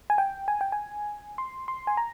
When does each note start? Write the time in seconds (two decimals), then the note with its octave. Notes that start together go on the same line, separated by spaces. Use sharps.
0.10 G#5
0.18 G5
0.48 G#5
0.61 G5
0.72 G#5
1.38 C6
1.68 C6
1.87 G#5
1.97 A#5